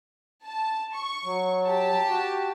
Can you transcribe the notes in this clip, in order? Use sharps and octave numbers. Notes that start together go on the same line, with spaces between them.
A5
C#6
F#3
G4 A5
F#4